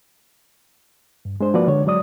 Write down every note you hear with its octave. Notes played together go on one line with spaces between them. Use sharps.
G2
G#3 D4 C5
F3 A#3 F#4 B4 D5
D3 G#3 C#5
F#3 G#3 D5 D#6